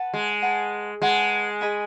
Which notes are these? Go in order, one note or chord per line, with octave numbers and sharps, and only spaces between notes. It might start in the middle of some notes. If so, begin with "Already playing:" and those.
Already playing: B4 F#5 A5
G#3
B4 F#5 A5
G#3 B4 F#5 A5
G#4 D#5 G#5 B5